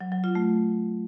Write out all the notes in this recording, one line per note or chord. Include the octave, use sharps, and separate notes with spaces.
F#3
F#3
F4
A3